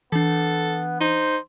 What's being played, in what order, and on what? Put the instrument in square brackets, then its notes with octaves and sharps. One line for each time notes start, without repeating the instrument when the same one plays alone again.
[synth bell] E3 D4 [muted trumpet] B3 [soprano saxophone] A4
[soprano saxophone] D#4 [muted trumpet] C5